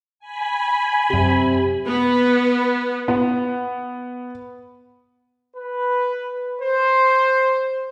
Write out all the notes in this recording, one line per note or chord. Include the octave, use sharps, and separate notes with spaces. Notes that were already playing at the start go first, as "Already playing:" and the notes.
G#5 B5
F#2 C3 G4
B3
B3
B4
C5